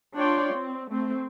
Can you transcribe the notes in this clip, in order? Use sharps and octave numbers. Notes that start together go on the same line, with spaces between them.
D4 F4 C#5 D5 G5 C6
C4
A3 C4